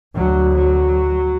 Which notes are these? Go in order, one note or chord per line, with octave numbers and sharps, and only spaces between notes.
D2 F#3
F#3